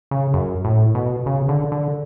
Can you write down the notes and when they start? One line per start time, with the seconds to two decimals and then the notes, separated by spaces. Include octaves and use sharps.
0.11 C#3
0.34 F#2
0.65 A2
0.95 B2
1.26 C#3
1.48 D3
1.72 D3